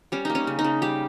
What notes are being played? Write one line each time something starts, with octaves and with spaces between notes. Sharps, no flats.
G3 C#4
A#3 D#4
C#4
C#3
D#4
C#3
G3 G4